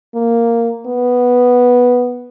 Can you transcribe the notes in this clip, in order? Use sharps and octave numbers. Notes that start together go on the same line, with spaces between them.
A#3
B3